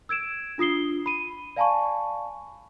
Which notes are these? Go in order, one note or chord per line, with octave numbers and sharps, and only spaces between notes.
E6 G#6 D7 E7
D4 F4 D#6 C7 G7
B5 D#7
D5 F5 G#5 A5 B5 C#6